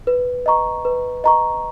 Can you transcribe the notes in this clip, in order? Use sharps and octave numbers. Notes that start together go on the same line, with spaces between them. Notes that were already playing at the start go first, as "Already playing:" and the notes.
B4
D#5 A#5 C#6
B4
D#5 A#5 C#6